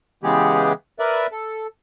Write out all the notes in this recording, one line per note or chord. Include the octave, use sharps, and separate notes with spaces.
C#3 E3 G#3 B3 G4 G#4
A#4 B4 D5 E5
A4